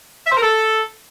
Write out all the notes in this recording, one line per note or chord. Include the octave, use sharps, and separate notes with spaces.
E5
C5
A#4
A4